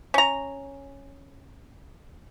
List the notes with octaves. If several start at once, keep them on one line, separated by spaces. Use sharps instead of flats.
C#4 A#5